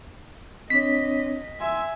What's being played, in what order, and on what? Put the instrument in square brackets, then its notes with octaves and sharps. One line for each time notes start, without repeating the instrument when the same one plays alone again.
[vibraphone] C4 D4 C#5 [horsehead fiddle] D#5 [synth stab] B6
[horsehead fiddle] E5 G#5 [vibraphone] C6 E6